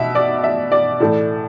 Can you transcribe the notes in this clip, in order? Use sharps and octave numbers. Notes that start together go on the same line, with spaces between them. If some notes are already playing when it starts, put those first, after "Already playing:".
Already playing: B2 E5
D5
E5
D5
A2 E3 A3